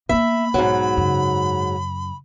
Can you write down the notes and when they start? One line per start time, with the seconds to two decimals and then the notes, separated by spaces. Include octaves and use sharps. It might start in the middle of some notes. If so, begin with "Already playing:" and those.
0.09 A#3 B3 E5 B5
0.54 B1 G#2 F#3
0.97 F#2 C#3